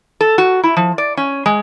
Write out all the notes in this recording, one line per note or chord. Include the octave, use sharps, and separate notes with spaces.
A4
F#4
E4
F3
D5
C#4
G#3